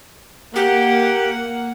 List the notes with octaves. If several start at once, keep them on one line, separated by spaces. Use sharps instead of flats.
A#3 G4 F#5